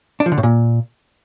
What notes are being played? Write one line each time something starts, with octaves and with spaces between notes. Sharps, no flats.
D4
F3
D3
A2
A#2